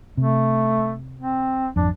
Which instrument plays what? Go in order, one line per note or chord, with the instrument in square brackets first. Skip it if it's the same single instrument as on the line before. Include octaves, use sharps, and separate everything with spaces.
[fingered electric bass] C3 [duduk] A3
[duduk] C4
[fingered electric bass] G#1 F2 [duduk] D4